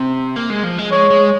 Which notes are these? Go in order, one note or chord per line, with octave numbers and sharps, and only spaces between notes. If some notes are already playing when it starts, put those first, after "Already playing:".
Already playing: C3
A#3
G#3
F3
G#3
G#3 C#5
G#3